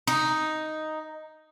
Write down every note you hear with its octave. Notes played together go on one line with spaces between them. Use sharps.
D#4